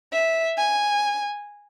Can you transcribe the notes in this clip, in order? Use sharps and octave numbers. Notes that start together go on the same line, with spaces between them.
E5
G#5